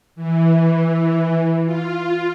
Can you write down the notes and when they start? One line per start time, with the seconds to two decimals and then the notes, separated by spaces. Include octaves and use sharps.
0.16 E3
1.65 F4